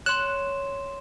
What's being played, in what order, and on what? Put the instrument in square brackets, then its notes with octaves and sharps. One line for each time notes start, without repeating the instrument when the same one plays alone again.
[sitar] C#5 [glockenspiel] C6 E7 [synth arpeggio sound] F#6